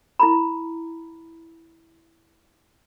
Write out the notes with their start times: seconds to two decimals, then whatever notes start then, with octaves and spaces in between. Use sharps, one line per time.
0.19 E4 A#5 B5